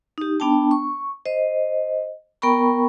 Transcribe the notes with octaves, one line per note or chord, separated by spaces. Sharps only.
D#4 G4
B3 D4 G5 A5
C#6
C5 D#5
B3 A#4 G5 A#5 B5 C#6